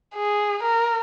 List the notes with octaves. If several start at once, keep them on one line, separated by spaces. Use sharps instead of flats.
G#4
A#4